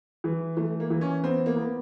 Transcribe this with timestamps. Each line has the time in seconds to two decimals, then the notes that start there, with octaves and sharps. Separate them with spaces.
0.24 E3
0.57 E3 A3
0.80 A#3
0.90 E3
1.01 C#4
1.24 B3 C4
1.46 A#3
1.57 B3